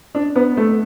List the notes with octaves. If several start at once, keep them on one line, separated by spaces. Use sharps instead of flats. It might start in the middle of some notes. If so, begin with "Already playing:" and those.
D4
B3
A3